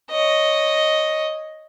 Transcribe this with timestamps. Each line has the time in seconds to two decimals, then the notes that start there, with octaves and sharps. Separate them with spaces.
0.11 C#5 D#5